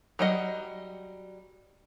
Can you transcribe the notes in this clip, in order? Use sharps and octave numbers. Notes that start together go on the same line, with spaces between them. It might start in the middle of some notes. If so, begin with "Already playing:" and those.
F#3 G3 D#5 F#5